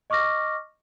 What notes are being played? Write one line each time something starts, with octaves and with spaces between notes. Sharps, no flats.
D#5 C#6 D6 F6 A#6